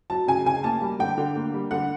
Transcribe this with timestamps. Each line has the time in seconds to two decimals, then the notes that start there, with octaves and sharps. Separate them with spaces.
0.10 F#3 A5
0.28 C#3 G#5
0.46 C#3 G#5
0.64 A#3 A5
0.82 G3
0.99 D3 G5
1.18 D3
1.35 A#3
1.54 G3
1.71 D3 F#5